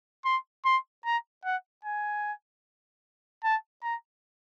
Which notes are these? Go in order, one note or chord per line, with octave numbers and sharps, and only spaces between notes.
C6
C6
A#5
F#5
G#5
A5
A#5